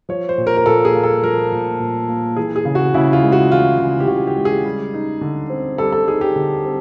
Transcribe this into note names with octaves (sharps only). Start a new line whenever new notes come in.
F3 C#5
C5
A#2
A#4
A#4
A#2 A4
G#4
A#3
A4
F3 A#4
A#2
A#2
A#3
E3 G#4
G#4
C#3
F#4
C#3 E4
F4
G#3
F#4
E3 F4
C#3
G4
C#3 F#4
G4
G#3
G#4
G3
D#4
D3
C4
G3 A4
A4
D#4 G#4
G4
D3
C4